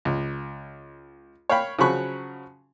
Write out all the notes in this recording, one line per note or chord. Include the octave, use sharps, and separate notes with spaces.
C#2
C#5 F5 G5 B5
C#3 F3 F#3 B5 C#6 F#6